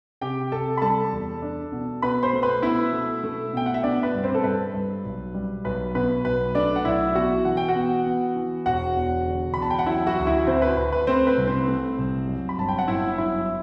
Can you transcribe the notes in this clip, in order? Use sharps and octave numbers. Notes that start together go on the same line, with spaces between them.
C3 G4 G5
C3 A4 A5
B5
G3 A4 A5
E2
D4
B2
B2 B4 B5
C5 C6
A3
B4 B5
B2 E4 E5
A3
A3
B2 G5
F#5
E5
B3 D4 D5
B4
G2
C4 C5
A4
G2 B4
G2
B1
G3
B1 B4
B2 B4
B1 B4
A3 D4 D5
F#5
B1 E4 E5
B2 F#4 F#5
E3 F#5
G5
F#4 F#5
B3
B3
E3
E1 F#4 F#5
E2
D3
E2 B5
A5
G5
F#5
F#3 E4 E5
F#4 F#5
D2
E4 E5
D2 C4 C5
B4
D2 B4
B4
A3 C4 C5
B4
C2
C4 C5
A3
C2
F#2
B5
G1 A5
G5
F#5
G1 E4 E5
F#2 E4 E5